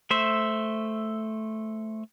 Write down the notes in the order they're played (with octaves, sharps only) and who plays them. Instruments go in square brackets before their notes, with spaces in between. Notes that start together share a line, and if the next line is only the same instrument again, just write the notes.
[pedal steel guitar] A3 C5 E5